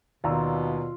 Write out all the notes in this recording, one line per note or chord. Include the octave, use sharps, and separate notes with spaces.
D#2 B2 F4 D5 A#5 E6